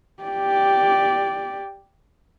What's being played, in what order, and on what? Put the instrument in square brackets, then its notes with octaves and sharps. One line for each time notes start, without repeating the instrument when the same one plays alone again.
[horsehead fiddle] G4 D5